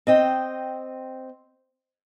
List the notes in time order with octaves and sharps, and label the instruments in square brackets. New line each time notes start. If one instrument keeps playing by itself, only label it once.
[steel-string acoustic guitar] C4 D#5 G5